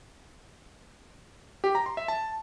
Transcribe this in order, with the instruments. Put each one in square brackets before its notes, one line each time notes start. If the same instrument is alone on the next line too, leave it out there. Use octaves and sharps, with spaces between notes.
[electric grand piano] G4
A#5
C6
E5
A5